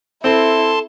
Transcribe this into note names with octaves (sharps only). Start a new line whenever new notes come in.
C4 E4 A4 A5 C6